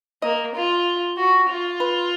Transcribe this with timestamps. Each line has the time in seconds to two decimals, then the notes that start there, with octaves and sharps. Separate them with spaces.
0.22 A#3 D#5
0.54 F4
1.17 F#4
1.49 F4
1.80 B4